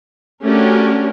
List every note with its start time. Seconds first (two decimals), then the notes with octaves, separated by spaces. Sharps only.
0.45 A3 C#4 D4 F#4 G4 A#4